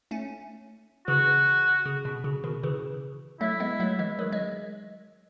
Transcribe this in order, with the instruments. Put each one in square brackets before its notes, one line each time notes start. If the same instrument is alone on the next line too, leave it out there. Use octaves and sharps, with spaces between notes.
[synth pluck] A3 C#4
[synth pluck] C#3 E3 [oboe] F#4
[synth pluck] C#3
B2
C#3
B2 D#3
C#3 E3
[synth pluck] F#3 A3 [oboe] E4
[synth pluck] G#3 B3
F#3 A3
E3 G#3
D#3 F#3
G#3